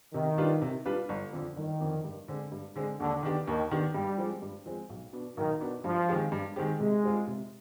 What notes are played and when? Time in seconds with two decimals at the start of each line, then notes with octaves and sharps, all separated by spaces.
0.14 C3 D#3
0.38 G3 D4 F4 B4
0.62 C3
0.85 G3 D4 F4 B4
1.09 G1
1.33 F2 D3 F3
1.57 G1 D#3
1.81 F2 D3 F3
2.04 G2
2.28 D3 G#3 C4
2.52 G2
2.76 D3 G#3 C4
2.99 D#2 D3
3.23 D#3 B3 D4 G4
3.47 D#2 D#3
3.71 D#3 B3 D4 G4
3.95 G2 G3
4.18 F3 G#3 C4
4.42 G2
4.66 F3 G#3 C4
4.90 B1
5.13 B2 B3 D4
5.37 B1 D#3
5.61 B2 B3 D4
5.84 G2 F3
6.09 D#3 G#3 C4 G4
6.32 G2
6.56 D#3 G#3 C4 G4
6.80 C3 G#3
7.04 G3 C4 F4
7.27 C3